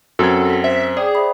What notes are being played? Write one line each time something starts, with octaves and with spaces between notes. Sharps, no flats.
F#2 C4 F#4 A4 F#5 G#6
A#6 B6
C5 E5
G#4 D5 G5
C5 E5 B5